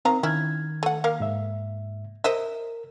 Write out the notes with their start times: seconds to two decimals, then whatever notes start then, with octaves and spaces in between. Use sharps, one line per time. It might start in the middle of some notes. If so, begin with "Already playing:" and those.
0.05 D#3 C4 F5 A#5
0.23 D#3 C#4 E4 F6 G#6
0.83 A3 F#5
1.04 A#3 A#4 F5
1.20 G#2 E5
2.24 A#4 C5 D#5 E5